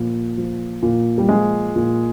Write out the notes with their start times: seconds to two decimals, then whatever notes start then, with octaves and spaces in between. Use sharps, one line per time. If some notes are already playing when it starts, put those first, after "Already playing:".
Already playing: A#2 F3
0.37 F3
0.82 A#2
1.18 G3
1.29 F3 G#3
1.76 A#2